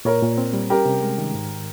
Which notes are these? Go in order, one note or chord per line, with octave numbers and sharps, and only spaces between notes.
A#2 A#4 C#5
A#2
C4
G3
C#4 G4 A#4
C3
G#3
D#3
G#2